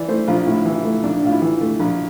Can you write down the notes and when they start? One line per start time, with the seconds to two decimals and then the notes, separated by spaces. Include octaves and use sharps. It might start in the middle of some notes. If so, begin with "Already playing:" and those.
Already playing: E3 D5
0.08 A3 C5
0.27 A#1 F4
0.47 A2 E4
0.65 E3
0.75 E4
0.85 A3
1.03 A#1 D4
1.23 A2 F4
1.32 E4
1.42 E3
1.61 A3
1.79 A#1